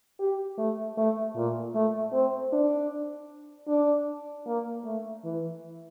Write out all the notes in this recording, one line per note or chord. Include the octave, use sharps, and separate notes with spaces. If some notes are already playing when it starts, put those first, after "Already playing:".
G4
A3
A3
A#2
A3
C4
D4
D4
A#3
A3
E3